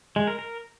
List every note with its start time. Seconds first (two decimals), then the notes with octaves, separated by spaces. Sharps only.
0.16 G#3
0.27 A#4
0.39 A#4